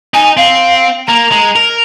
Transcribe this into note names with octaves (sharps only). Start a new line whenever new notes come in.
D#4 G#5
C4 F5
A#3 A#5
G#3
A#4